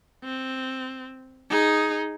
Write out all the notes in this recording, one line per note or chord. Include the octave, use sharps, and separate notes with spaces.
C4
D#4 G#4